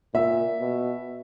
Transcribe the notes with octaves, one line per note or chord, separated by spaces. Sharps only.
A#2 E5
B2